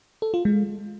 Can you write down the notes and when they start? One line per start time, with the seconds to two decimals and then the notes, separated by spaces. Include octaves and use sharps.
0.22 A4
0.34 F4
0.45 G#3